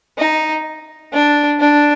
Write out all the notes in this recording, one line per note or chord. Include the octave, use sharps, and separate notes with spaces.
D#4
D4
D4